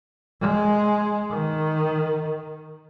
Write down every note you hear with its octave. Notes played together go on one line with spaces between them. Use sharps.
G#3
D#3